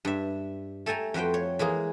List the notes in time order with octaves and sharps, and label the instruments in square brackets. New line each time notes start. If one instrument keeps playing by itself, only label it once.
[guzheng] G2 E5
A3 A4 G5 G#5 A#5
F2 F#4 B4 C5 G5
C#5
E3 G#3 A#3 G#4